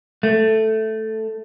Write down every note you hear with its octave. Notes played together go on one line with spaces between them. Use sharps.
A3